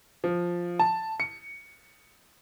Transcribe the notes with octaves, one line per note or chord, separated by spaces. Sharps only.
F3
A5
C#7